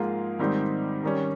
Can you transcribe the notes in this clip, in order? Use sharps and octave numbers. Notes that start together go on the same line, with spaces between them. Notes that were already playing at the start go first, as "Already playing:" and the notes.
Already playing: G#2 F3 A#3 F4 G#4
G#2 D#3 G3 C4 D#4
D#3 G3 C#4